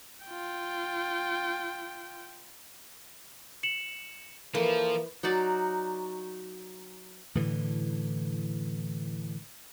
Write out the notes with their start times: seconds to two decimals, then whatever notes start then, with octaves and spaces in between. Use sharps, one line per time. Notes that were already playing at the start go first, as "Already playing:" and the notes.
0.25 F4 G5
3.63 C#7 E7 F#7
4.55 E3 F3 A#3 A4
5.23 F#3 D#4 F#4 D5
7.35 A2 D3 E3